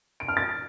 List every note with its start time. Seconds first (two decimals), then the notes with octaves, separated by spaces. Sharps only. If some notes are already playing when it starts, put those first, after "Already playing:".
0.20 D7
0.28 F6
0.37 A6